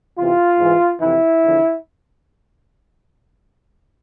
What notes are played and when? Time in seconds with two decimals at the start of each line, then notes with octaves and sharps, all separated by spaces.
0.17 E2 C3 E3 F4
0.59 G#2 E3
1.01 F2 C3 E3 E4
1.43 E2 D3 F3